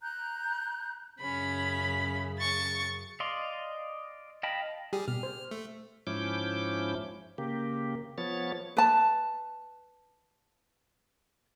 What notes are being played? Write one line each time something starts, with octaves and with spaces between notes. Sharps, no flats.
A#5 F#6 G6
F#2 C#3 C#4 B5
C#6 A6
D5 D#5 F5 C6
D#5 F5 G5 A5 B5
G3 G4 G#4
B2 F6
C5
A3
G#2 F3 C#4 E4 D6 G6
C#3 A#3 G4
F3 B3 C#5 A6
B4 A5